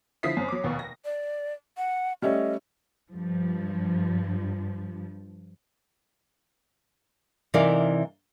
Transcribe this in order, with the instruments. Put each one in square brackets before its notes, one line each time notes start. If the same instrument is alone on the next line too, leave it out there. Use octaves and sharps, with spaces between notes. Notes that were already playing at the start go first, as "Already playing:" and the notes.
[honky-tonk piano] D3 F3 E4 D#6 B6 C7
F#2 C4
F#3 D6
F1 D#2 B2
A#6
[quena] D5
F#5
[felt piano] G3 A3 C#4 [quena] D#5
[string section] G2 F3
[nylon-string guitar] C3 E3 D#4 A#4 D5 F5